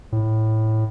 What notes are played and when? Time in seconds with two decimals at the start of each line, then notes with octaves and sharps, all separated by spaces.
0.12 A2